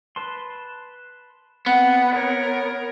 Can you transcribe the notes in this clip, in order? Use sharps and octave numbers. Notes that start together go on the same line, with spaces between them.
B4 A5 C6
B3 C4 F#5
A#4 C#5